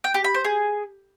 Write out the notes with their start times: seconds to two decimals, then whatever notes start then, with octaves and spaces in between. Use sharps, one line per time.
0.04 G5
0.14 G4
0.24 B5
0.34 C5
0.45 G#4